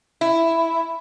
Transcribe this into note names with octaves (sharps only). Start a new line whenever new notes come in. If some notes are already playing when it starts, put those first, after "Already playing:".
E4